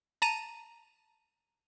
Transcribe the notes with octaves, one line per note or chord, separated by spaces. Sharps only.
A5 A#5 D#7